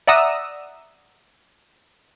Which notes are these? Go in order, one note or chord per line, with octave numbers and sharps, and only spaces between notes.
D5 E5 F#5 A#5 D#6 E6